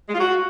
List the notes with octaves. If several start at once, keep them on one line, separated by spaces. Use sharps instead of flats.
G#3
F4
F#4